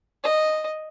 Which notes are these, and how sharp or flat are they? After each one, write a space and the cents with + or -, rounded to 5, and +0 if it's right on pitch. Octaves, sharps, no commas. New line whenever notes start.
D#5 -5